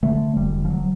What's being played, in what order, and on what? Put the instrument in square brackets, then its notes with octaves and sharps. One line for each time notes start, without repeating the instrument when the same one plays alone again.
[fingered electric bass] D3 A3
E1 G3
F3
F#3